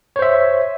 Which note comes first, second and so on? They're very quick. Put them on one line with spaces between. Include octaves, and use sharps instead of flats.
C#5 C5 E5